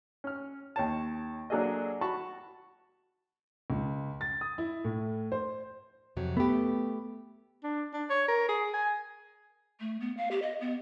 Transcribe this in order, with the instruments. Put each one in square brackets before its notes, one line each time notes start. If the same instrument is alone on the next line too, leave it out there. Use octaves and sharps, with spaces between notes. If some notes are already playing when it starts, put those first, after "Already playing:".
[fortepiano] C#4 F6
D#2 C#5 A5
F#3 A#3 D4 G#4 A4 D#5
F#4 A5 B5 C#6
[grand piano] C#2
A6
D#6
E4
A2
C5
[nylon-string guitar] F2 C3 F#3
[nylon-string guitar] A3 G4 [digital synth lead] B3
[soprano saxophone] D4
D4
C#5
A#4
G#4
G#5
[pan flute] A3
B3
F5
G4
D#5
B3